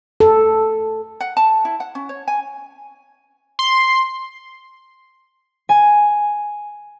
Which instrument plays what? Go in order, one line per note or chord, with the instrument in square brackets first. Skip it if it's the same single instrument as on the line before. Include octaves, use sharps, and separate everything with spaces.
[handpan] A4
[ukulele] F#5
A5
E4
F#5
C#4
C#5
G#5
[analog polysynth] C6
[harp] G#5